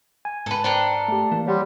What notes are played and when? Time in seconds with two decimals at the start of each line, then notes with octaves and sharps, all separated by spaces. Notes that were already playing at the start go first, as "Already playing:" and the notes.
0.25 G#5
0.46 G#2 A4 B4
0.64 D4 A4 A#4 C5 G5
1.08 A3 G4
1.32 E3 A#3
1.47 G3 C#5 F#5 C6